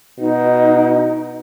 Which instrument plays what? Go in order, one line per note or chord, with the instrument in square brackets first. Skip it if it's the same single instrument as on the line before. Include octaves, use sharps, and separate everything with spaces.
[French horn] B2 [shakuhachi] D#4